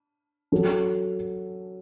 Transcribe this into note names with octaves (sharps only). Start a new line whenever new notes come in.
F#3 C#4 F#4 A4